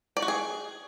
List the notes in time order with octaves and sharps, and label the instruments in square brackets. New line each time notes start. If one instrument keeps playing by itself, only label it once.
[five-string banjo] D5
F#4
G#4